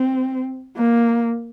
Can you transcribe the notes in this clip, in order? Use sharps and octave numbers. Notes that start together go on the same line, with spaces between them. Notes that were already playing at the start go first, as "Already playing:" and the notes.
Already playing: C4
A#3